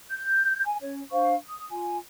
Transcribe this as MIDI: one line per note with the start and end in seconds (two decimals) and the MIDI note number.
0.10 0.63 91
0.66 0.76 80
0.81 1.01 61
0.81 1.01 73
1.12 1.34 62
1.12 1.34 72
1.12 1.34 77
1.12 1.34 85
1.45 1.67 87
1.70 1.96 65
1.70 1.96 80